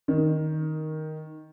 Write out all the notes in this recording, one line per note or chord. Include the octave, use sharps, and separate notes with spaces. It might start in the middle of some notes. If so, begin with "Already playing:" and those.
D#3